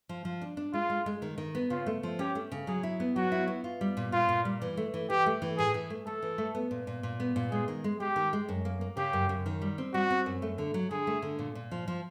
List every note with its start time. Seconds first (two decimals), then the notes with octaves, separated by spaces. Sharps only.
0.09 F3
0.25 F3
0.41 D4
0.57 D4
0.73 G#3 F4
0.90 G#3
1.06 G#3
1.22 D#3
1.38 D#3
1.55 B3
1.70 C#3 F4
1.86 A3
2.03 F3
2.19 C#4 G4
2.35 A3
2.52 C#3
2.67 F#3 G#4
2.83 E4
3.00 B3
3.16 F#3 F#4
3.32 E4
3.47 B3
3.64 F4
3.81 G3
3.97 A#2
4.12 A#2 F4
4.29 A#2
4.45 G3
4.62 E3
4.77 A3
4.94 E3
5.10 E3 G4
5.26 A3
5.42 E3
5.58 A2 G#4
5.74 E3
5.90 A3
6.07 A3 A4
6.22 E3
6.38 A3
6.55 B3
6.71 A#2
6.87 A#2
7.03 A#2
7.20 B3
7.36 A#2
7.51 G#3 G#4
7.68 D#3
7.84 G#3
8.00 G#3 G4
8.16 D#3
8.33 G#3
8.49 F#2
8.65 A#3
8.81 A#3
8.97 C#3 G4
9.13 F#2
9.29 F#2
9.46 D#3
9.62 G3
9.78 C4
9.93 G3 F#4
10.11 C4
10.26 F#2
10.42 A3
10.58 D3
10.74 F#3
10.91 D3 G#4
11.07 A3
11.22 D3
11.39 A#2
11.55 A#2
11.71 F3
11.88 F3